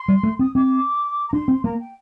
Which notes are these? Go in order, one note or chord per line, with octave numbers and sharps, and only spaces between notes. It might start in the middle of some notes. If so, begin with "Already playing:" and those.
Already playing: C6
G3
A3
C4 D#6
C4 D6
A#5
D4 C6
C4
A#3 A#5
G5